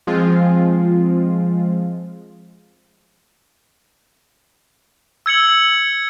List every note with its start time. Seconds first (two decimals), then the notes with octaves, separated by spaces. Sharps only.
0.07 F3 G#3 C4 F4
5.26 E6 G#6 C#7 F#7